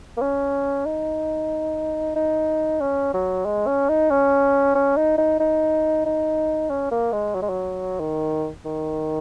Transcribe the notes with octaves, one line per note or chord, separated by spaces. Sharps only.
A#3
C#4
D#4
D#4
C#4
F#3
G#3
C#4
D#4
C#4
C#4
D#4
D#4
D#4
D#4
C#4
A#3
G#3
F#3
G#3
F#3
D#3
D#3